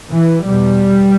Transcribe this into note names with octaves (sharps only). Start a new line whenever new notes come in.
E3
E2 B2 G3